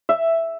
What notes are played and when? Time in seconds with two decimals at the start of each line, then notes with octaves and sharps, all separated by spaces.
0.09 E5